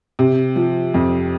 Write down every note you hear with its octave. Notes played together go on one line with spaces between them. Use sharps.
C3
F3
F2